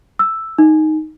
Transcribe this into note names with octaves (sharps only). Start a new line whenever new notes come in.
E6
D#4